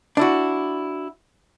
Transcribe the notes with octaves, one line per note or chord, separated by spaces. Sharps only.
D4 E4 F#4